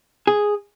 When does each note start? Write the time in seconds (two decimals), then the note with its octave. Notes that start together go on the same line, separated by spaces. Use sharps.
0.27 G#4